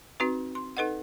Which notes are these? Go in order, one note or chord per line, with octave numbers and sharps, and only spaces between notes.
C4 D#4 F#4 B4
C6
D#4 A4 B4 D#5 F#5